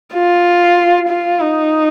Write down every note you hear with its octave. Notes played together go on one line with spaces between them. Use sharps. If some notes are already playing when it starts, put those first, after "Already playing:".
F4
F4
D#4